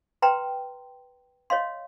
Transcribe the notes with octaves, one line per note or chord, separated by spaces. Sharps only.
B4 G5 A#5 C6
C#5 D#5 F5 C6